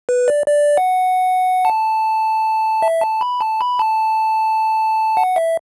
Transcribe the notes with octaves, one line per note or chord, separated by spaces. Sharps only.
B4
D5
D5
F#5
A5
E5
A5
B5
A5
B5
A5
F#5
E5